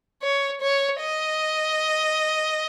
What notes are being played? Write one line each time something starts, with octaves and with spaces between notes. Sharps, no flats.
C#5
C#5
D#5